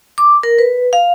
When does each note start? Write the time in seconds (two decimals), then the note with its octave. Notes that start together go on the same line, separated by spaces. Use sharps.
0.18 D6
0.43 A#4
0.59 B4
0.93 F5